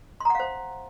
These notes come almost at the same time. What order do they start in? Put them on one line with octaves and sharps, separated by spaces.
C6 A#5 F#5 F5 C5